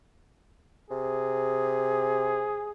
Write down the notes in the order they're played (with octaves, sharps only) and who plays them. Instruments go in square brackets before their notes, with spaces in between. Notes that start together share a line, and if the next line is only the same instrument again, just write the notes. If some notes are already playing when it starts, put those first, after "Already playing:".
[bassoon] C3 [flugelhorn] G#4